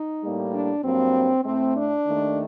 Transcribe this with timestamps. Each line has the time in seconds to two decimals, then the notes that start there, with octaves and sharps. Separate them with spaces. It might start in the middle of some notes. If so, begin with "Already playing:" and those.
Already playing: D#4
0.22 A2 G3 A#3
0.52 D4
0.82 G2 F#3 A#3 C4
1.44 A2 A3 C4
1.74 D4
2.04 D#2 D#3 A3